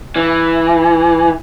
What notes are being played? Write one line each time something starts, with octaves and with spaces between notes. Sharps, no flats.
E3